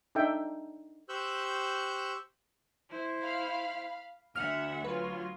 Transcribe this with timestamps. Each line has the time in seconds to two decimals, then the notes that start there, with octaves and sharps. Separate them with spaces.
0.15 D4 D#4 A4 E5 G5
1.09 G4 C5 C#6 E6 F#6 G6
2.90 E4 C5
3.23 F5 B5
4.35 D2 E5 F#5 F6
4.84 F#3 F4 B4